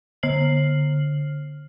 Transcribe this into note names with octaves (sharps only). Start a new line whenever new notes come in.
D3 F6 C7 F#7